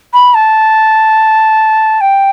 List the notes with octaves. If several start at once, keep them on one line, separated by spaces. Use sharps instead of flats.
B5
A5
G5